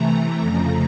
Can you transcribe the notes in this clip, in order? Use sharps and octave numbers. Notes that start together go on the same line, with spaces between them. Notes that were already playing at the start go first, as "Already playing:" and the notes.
Already playing: C3 E3 A3 A#5
F2 C#3 F3 A3